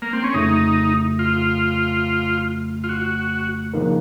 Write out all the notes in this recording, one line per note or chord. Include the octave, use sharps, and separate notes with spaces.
A#3
C4
C#4
F2 C#3 A3 D#4
F4
F4
F#4
C#3 F3 A#3 D#4 A#4